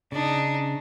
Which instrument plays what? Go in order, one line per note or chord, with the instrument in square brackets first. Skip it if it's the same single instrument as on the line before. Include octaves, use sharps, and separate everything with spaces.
[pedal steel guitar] C#3 [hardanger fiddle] D4 D#4